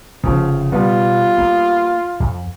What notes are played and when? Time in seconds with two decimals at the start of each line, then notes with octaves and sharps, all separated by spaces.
0.24 F1 C#3 F3
0.72 B2 G3 B3 F4
1.38 A#3
2.20 F2